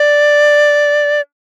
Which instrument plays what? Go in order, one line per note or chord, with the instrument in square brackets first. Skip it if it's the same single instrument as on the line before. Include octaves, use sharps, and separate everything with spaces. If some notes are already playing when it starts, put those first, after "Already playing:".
Already playing: [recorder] D5